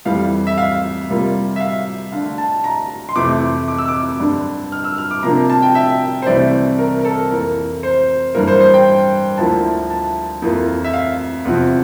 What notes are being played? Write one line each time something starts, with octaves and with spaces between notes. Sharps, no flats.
F2 E3 G3 F5
E5
F5
C3 G3 A#3 F4
E5
F5
D3 A3 D4 F5
A5
A#5
C6
F2 C3 E3 A3 D6
D6
E6
D6
G2 D3 G3 D4
F6
E6
F6
D6
C3 F3 A#3 D4 A#5
A#5
A5
G5
E5
C5
C2 C3 E3 A3 D5
A#4
A#4
A4
F2 E3 A#3 A#4
C5
G2 E3 A#3 A#4
C5
C5
G5
D2 D3 F3 A#3 E4 A5
A5
F2 E3 A#3 F4
E5
F5
E2 C3 F3